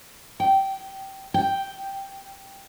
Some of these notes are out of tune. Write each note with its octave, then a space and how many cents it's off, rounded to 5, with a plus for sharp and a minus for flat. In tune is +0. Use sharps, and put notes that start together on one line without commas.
G5 -15
G5 +0